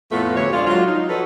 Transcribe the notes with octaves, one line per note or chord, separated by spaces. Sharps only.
F2 A2 A3 B3 F4
D2 C3 C#5
G#3 D4 F4
F#3 F4
D#4
F3 F#4 A4 B4 C#5